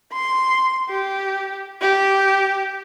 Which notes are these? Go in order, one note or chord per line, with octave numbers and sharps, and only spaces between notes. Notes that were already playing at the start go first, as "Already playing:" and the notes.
C6
G4
G4